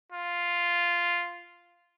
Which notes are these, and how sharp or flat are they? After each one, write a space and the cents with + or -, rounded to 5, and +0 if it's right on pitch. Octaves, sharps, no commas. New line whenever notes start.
F4 -5